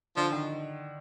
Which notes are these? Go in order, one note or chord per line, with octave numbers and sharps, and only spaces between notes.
D3 F3
D#3